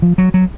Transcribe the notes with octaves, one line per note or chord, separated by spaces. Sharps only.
F3
F#3
F#3